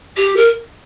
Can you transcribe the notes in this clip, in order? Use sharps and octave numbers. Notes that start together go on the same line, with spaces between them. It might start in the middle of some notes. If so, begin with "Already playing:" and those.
G4
A#4